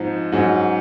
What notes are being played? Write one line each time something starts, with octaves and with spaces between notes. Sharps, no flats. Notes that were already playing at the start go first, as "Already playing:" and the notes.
Already playing: G#2 F3 C4 D#4
G#2 F#3 C#4